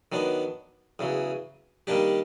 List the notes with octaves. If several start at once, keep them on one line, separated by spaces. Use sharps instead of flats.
D#3 F#3 B3 D4
E2 C#3 F#3
D#3 G3 A#3 D4 G4